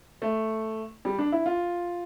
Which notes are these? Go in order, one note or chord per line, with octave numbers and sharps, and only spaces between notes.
A3
G3
D4
E4
F4